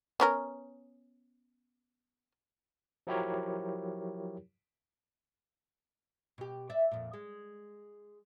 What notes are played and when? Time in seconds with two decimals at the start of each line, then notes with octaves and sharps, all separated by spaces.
0.20 B3 C#4 A#4
3.07 F3 F#3 E4 G4 A#4 C#5
6.38 B2 G4
6.70 D5 E5
6.91 F2 A#2
7.13 G#3